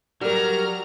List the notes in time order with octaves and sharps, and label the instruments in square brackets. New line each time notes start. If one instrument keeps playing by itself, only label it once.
[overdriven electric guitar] F#3 [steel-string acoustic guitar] G3 [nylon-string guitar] A#4 G5 [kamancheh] A#5 F6